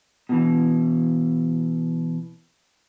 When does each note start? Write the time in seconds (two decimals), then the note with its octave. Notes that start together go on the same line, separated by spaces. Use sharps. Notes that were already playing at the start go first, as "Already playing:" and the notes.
0.29 B2 E3